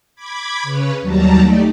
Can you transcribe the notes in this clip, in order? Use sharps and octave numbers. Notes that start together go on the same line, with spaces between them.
B5 D6 G#6
C#3 C#4 B4 C#5
D#2 F#3 G3 A5 A#5
A3 D#4 G4 D5